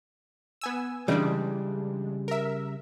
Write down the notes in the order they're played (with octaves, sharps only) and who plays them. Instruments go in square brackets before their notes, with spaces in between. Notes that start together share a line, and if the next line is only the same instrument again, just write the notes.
[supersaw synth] B3 G#5 E6
[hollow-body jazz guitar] C#3 G3 [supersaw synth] E3 G#3 D4
[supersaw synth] A#4 E5